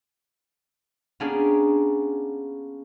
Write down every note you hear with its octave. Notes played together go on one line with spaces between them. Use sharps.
A#3 B3 C#4 D4 G4 G#4